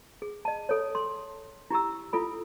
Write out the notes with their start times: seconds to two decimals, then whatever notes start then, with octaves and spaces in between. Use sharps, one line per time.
0.22 G#4
0.45 D#5 A5
0.69 A4 C#5
0.95 C6
1.71 E4 G4 A#5 E6
2.13 E4 F4 A4 B5